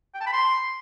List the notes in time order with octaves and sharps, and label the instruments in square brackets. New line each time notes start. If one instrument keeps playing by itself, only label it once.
[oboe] G5
A5
B5
C6